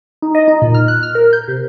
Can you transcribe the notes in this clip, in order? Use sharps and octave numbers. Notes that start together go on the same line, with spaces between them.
D#4
D#5
D#4
A#2
F6
F#6
F6
A#4
G6
C3